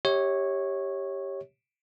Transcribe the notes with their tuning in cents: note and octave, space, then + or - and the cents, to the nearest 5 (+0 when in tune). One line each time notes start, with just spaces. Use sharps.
G4 +0 C#5 -10 E5 -40